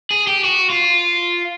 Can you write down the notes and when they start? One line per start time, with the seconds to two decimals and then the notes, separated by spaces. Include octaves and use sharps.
0.11 G#4
0.27 G4
0.44 F#4
0.70 F4